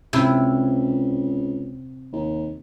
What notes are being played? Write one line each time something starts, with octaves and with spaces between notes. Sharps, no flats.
C#2 C3 E4
D#2